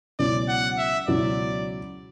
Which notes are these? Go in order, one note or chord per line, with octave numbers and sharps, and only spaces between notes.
C#2 B2 F#3 C#4 E4 D5
F#5
E5
C#2 B2 F#3 C#4 E4 D5